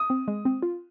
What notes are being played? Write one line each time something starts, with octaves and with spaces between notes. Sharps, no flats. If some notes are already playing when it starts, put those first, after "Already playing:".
Already playing: D#6
C4
G#3
C4
F4